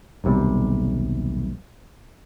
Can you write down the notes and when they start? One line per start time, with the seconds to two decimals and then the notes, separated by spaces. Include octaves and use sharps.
0.24 D#1 B1 C3 G3